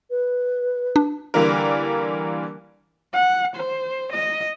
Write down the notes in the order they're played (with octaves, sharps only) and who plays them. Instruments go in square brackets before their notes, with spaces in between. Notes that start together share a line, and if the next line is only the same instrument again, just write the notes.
[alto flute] B4
[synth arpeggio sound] D4
[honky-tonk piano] D3 E3 G3 A#3 D4 A#4
[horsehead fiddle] F#5
C5
D#5